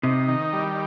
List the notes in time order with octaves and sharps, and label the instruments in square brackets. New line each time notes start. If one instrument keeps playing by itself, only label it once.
[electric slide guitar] C3 [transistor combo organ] D#4
[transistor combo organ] D#3
G3